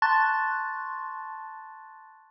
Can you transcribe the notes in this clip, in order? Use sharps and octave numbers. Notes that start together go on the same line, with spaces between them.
A5 C6 C#6 F#6 A6